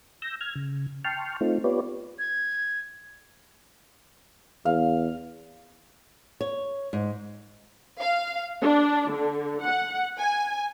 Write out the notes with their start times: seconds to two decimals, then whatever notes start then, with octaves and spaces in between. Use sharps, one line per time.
0.22 E6 G6 A#6
0.41 F6 G#6
0.55 C#3
1.05 G5 A5 C6 C#6 F6
1.41 A3 C4 D#4 F4
1.64 B3 F4 G4 B4 C#5 D5
2.19 G#6
4.65 E2 F5
6.41 C#5
6.93 G#2
8.00 F5
8.61 D4
9.09 D3
9.63 F#5
10.18 G#5